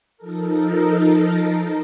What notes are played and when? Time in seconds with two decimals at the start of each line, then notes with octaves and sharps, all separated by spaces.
0.17 F3 D#4 A4 A#4